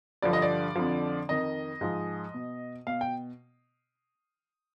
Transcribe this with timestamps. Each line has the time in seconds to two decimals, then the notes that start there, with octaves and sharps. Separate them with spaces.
0.22 G2 D3 F3 D5
0.33 D#5
0.42 D5
0.75 F2 D3 F3
1.29 F2 D#3 D#5
1.81 G#2 F3
2.34 B2
2.87 B2 F5
3.01 G5